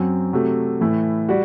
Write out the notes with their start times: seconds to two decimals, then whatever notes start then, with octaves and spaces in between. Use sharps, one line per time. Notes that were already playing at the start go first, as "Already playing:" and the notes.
Already playing: F#2 F#3 C4
0.33 C3 F#3 A3
0.81 A2 E3 A3 E4
1.29 G3 F#4